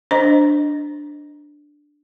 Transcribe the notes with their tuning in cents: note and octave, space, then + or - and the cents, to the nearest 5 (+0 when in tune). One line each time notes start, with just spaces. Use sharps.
D4 +0 C5 +0 D#5 +0